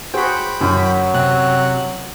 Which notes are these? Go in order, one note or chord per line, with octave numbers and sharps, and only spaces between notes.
F#4 G#4 C5 G5 B5
F#2 F#3
C3 C4 F#6